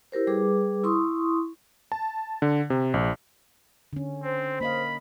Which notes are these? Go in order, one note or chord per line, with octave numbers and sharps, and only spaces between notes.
E4 G4 A#4 C5
G3 G#4 B4 D6
E4 C6 C#6 D#6
A5
D3
C3
A#1
D3 C#4
C4 C5
A#3 D#5 F5 B5